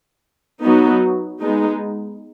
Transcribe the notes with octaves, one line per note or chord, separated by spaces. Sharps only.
F#3 B3 D#4 F#4
G#3 B3 D#4